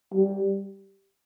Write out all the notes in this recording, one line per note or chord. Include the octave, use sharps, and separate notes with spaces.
G3